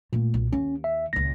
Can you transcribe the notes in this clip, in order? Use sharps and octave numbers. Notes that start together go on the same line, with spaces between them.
A#2 A3 A#3
B1
D#2 C#4
E5
C#2 A#2 A#6